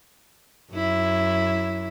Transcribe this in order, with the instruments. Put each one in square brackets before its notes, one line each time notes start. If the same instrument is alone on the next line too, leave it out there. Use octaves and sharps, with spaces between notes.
[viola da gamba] F#2 E4